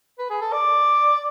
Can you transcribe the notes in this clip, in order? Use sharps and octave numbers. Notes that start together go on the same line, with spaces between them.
B4
G#4
A4
D5